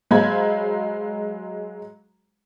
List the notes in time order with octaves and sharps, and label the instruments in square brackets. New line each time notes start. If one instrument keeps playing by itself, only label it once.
[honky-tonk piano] F#3 G#3 C5 F5 B5 G#6